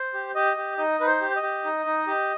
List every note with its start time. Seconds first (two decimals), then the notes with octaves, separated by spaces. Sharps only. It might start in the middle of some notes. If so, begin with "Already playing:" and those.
Already playing: C5
0.14 G4
0.35 G4 D#5
0.57 G4
0.78 D#4 D#5
1.00 D#4 B4
1.06 C5
1.21 G4
1.36 D#5
1.43 G4
1.64 D#4
1.86 D#4
2.07 G4